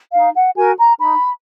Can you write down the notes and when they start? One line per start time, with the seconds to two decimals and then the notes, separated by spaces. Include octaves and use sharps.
0.14 D#4 F5
0.35 F#5
0.56 F#4 A#4 G#5
0.78 A#5
0.98 D#4 B5